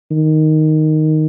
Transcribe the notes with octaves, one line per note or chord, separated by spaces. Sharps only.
D#3